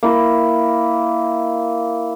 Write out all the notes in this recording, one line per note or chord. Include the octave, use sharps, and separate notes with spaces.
A#3 E4